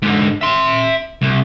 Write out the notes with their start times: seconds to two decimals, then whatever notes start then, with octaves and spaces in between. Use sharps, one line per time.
0.02 G#2 D3
0.41 E5 C6
1.22 C2